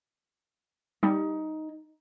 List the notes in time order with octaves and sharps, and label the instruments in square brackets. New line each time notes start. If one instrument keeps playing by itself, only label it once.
[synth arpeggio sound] G3 [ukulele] D#4